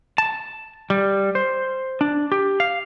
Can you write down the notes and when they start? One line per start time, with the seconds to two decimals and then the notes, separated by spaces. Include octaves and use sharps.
0.18 A5
0.90 G3
1.35 C5
2.01 D4
2.32 G4
2.60 F5